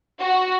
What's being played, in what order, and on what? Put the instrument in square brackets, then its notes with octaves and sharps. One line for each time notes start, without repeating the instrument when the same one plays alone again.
[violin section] F#4